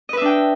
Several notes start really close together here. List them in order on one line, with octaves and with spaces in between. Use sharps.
D#5 B4 E5 D4 G5